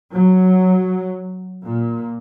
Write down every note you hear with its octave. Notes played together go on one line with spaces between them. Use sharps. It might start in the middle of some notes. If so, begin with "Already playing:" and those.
F#3
A#2